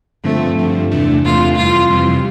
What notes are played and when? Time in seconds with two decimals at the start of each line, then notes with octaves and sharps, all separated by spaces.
0.24 G2 D3 F3 A3 C4
0.58 G2 D3 F3 C4
0.91 E2 C3 E3 A3 D4
1.24 E2 C3 E3 A3 D4 F4
1.57 F2 C3 E3 G3 F4
1.90 F2 C3 E3 G3